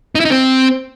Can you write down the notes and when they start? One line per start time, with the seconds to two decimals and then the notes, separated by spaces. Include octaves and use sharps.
0.15 D#4
0.20 E4
0.25 D#4
0.30 C4